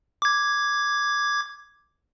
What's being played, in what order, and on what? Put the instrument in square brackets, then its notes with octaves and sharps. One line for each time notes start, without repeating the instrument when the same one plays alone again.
[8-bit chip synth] D6 G#6